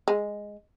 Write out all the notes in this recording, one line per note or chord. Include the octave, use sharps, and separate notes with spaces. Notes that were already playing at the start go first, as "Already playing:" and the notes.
G#3